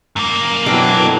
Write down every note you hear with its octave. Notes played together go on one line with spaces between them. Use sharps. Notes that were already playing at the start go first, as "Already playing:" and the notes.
F#2 A#3
B2 E3 F#3 D4 G4 A4